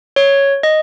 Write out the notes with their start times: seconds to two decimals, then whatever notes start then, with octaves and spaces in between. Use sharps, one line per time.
0.16 C#5
0.63 D#5